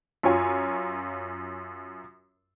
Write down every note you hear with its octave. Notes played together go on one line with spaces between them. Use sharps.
F#2 F4 C#5 G#5